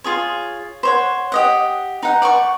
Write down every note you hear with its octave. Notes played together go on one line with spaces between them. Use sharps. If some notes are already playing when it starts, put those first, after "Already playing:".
F4 G#4 C#5
C5 C#5 F#5
G4 D#5 F#5
D#4 F#5
D5 F#5 G5 C#6